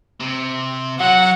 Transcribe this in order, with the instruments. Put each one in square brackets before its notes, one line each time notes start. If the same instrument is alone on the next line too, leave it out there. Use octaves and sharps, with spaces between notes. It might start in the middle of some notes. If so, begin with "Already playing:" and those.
[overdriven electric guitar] C3
[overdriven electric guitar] F#3 [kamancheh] F#5